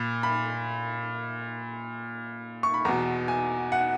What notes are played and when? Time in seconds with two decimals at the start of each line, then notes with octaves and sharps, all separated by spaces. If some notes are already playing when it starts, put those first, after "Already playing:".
Already playing: A#2 B5
0.23 B5
2.63 C#6
2.74 B5
2.85 E2 B2 A#5
3.28 G#5
3.72 F#5